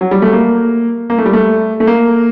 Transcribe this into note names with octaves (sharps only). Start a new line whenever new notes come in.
F#3
G3
A3
A#3
A#3
A3
G3
A3
A3
A#3